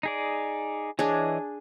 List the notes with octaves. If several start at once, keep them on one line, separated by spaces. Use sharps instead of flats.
D#4 G#4 D5
E3 D4 G#4 C#5 D#5